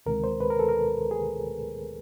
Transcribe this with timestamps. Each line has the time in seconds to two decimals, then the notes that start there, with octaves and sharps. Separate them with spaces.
0.06 D2 C3 D#3 G#3 A#4
0.24 C5
0.41 B4
0.50 A#4
0.59 A4
0.69 A#4
1.11 G#4